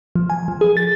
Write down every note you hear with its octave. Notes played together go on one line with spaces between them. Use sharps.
F3
G#5
F3
G#4
A6